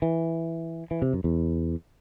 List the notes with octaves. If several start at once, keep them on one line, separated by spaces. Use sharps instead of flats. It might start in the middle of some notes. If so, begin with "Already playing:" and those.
E3
E3
C3
F#2
E2